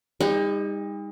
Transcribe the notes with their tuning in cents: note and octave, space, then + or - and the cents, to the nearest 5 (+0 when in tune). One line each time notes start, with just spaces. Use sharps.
G3 +45 D#4 +15